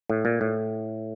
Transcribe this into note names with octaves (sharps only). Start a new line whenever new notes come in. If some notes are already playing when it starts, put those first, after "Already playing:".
A2
A#2
A2